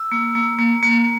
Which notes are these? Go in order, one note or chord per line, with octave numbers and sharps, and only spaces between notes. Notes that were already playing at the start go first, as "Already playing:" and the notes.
Already playing: E6
A#3
A#3
A#3
A#3